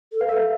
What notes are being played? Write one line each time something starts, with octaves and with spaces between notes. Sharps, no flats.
A4
B4 F5
A4 E5
F5